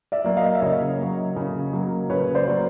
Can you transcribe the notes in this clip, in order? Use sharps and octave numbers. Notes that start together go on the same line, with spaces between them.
D5 E5
F#3 A#3
D#5 F5
E5
C#3 C#5 D#5
F#3 A#3
C#3
F#3 A#3
C#3 B4 C#5
C5 D5
F#3 A#3